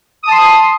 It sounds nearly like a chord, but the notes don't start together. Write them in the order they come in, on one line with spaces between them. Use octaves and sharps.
D#6 A5 C6